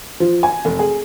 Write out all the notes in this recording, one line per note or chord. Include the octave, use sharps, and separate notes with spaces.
F3
G#5
F1
G#4